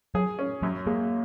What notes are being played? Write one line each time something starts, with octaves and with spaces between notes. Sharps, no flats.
F#3 G#4
C#4
F#2 F#3
G#3 A#3